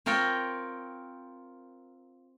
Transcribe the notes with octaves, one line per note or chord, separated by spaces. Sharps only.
C4 F4 A#4 C#5 G5